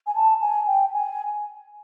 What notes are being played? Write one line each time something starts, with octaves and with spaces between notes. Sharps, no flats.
G#5
A5
G#5
G5
G#5